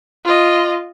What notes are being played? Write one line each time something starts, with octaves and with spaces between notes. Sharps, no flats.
F4 D#5